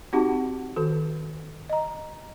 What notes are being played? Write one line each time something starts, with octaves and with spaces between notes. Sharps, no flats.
C4 D#4 F#4 G4 F#5 A5
D#3 F#4 A4 C5
D#5 A#5